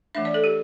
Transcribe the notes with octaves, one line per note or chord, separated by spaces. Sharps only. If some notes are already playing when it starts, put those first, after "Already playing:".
E3 A3 D4 E5
D5
A4
G4